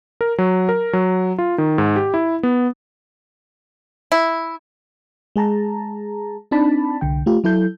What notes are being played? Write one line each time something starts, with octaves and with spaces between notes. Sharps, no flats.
A#4
F#3
A#4
F#3
F4
D#3
G#2
G4
E4
B3
E4
G#3 G#4 A5 A#5
C4 D4 D#4 D5 A5 B5
C2 D3 G5
A3 F4 G4
F#3 E4 A4 G6